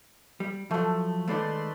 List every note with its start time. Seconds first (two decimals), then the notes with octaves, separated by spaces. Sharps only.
0.40 G3
0.71 F3 F#3 A3
1.28 D#3 G#3 A3 B4 D5 C6